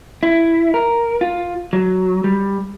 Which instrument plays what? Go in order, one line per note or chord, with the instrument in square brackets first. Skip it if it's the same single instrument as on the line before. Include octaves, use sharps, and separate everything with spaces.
[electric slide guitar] E4
A#4
F4
F#3
G3